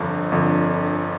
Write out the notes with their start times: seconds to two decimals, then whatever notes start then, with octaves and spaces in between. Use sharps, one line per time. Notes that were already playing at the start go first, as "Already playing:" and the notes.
Already playing: G1 F2 D3
0.32 G1 F2 D3